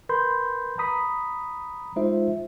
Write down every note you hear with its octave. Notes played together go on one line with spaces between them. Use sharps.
A#4 B4 B5 C6 G6
A#5 B5 D#6 B6
G#3 D#4 F4 C5 E5